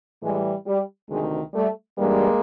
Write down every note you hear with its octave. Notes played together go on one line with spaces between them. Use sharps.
A2 E3 G3 G#3
G3
D2 C3 D#3 G#3
G3 A3
G2 E3 G3 G#3 A#3